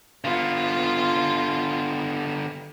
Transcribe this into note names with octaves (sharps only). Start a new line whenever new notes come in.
D3 B3 F4